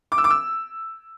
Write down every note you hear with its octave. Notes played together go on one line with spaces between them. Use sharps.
D6
E6
D6
E6